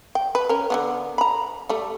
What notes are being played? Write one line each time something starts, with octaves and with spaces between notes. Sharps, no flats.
G5
B4
C#4 A#4
D3 A#3 B3
A#5 B5
G3 A3